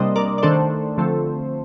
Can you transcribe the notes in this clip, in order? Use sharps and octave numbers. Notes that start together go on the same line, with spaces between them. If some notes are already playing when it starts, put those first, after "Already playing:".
Already playing: C3 G3 A#3 D4 C5 D#5
A#4 D5
D5
D#3 A3 D4 A4 C5
D3 F3 A3 C4